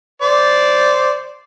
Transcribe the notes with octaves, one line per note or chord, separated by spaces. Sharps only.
C5 D5